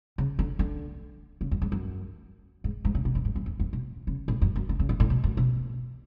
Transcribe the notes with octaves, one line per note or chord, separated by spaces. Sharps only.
C#3
D3
D3
C#3
F#2
G#2
F#2
G#2
G#2
C#3
B2
F#2
G#2
F#2
F2
F2
B2
C#3
A2
F#2
F#2
D3
C#3
A2
A2
B2
F#2
B2